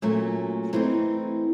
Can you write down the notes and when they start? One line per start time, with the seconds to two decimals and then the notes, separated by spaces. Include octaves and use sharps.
0.02 A#2 F#3 A3 C#4
0.73 E3 A3 C4 D#4